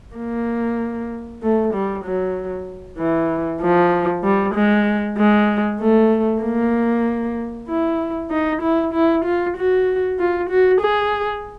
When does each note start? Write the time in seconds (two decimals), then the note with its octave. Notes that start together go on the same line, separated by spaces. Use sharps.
0.16 A#3
1.43 A3
1.74 G3
2.04 F#3
2.98 E3
3.62 F3
4.24 G3
4.55 G#3
5.17 G#3
5.81 A3
6.42 A#3
7.69 E4
8.31 D#4
8.62 E4
8.93 E4
9.25 F4
9.57 F#4
10.19 F4
10.50 F#4
10.81 G#4